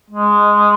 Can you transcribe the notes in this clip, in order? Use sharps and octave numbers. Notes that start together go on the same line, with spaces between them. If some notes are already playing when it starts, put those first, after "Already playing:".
G#3